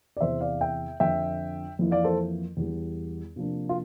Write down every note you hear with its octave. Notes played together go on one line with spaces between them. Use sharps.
D5
E2 C3 E3 C5 E5
D5 F5
E5 G5
F2 D3 F3 E5 G5
F2 E3 A#3 E4
D5 F5
A4 C5
E2 E3 G3
C3 F3 A#3 D4
F4